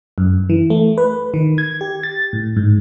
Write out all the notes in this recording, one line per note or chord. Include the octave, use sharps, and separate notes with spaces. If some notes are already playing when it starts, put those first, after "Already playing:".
F#2
E3
A3
B4
D#3
G#6
G4
A6
A2
G#2